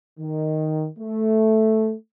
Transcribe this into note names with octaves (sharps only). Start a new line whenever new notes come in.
D#3
A3